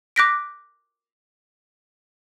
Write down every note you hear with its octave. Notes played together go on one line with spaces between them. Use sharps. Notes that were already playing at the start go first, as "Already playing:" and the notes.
D6 F#6 G6 A#6 B6 D7